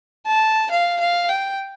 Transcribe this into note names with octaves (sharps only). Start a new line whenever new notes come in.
A5
F5
F5
G5